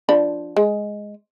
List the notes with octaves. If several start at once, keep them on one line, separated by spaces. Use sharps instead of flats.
F3 D4 B5
G#3